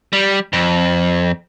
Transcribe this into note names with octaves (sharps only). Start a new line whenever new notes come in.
G3
F2